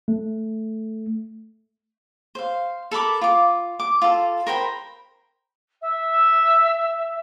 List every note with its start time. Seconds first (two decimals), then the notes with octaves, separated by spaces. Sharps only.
0.08 A3
2.35 C5 F5
2.91 A4 A#4 B5 D6
3.21 F4 D6
3.80 D6
4.02 F4 A4
4.47 A#4 C5 G5 B5
5.81 E5